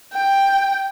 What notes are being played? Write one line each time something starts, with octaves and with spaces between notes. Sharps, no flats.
G5